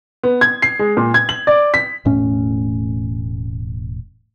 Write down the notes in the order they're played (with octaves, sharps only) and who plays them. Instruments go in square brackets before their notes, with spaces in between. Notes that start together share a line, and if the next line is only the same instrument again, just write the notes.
[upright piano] B3
G#6
C7
G#3
A#2
G#6
F#7
D5
B6
[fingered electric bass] E1 A2 A3 C#4